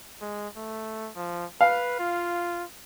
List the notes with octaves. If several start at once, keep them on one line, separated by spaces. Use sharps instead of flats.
G#3
A3
F3
B4 F5
F4